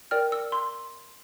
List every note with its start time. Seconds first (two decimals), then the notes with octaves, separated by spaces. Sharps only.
0.11 A#4 D5 G5 F6
0.32 E6
0.52 C6